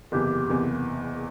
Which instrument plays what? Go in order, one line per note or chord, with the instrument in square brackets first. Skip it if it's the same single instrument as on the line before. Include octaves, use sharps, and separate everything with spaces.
[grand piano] F#1 E2 C3 E3 [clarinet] G4
[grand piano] F#1 E2 C3 E3